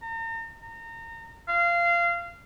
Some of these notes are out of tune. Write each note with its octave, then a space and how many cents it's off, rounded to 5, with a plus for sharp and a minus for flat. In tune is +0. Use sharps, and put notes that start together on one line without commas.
A#5 -40
A#5 -30
F5 -20